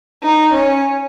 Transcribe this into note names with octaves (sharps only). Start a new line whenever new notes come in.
D#4
C#4